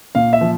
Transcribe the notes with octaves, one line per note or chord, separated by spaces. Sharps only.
A#2 F5
E5
F3